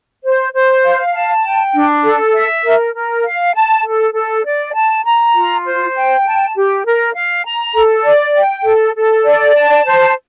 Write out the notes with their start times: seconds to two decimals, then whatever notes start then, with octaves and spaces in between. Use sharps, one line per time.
0.23 C5
0.54 C5
0.83 F5
1.14 A5
1.44 G5
1.74 D4
2.03 A4
2.33 E5
2.64 A#4
2.94 A#4
3.24 F5
3.55 A5
3.84 A4
4.14 A4
4.44 D5
4.74 A5
5.04 A#5
5.34 F4
5.64 C5
5.95 G5
6.24 A5
6.55 G4
6.85 A#4
7.14 F5
7.45 A#5
7.74 A4
8.04 D5
8.35 G5
8.65 A4
8.95 A4
9.25 D5
9.55 A5
9.85 C5